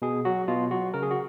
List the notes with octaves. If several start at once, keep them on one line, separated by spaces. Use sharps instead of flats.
B2 G#4
F#3 F#4
B2 F4
F#3 F#4
C#3 A#4
G#4
F#4